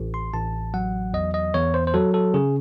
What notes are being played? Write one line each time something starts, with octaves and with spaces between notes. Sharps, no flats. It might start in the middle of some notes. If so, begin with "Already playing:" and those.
Already playing: A1
C6
A1 A5
F#3 F#5
E2 D#5
D#5
E2 C#5
C5
C5
F#3 A4
A4
C#3 G#4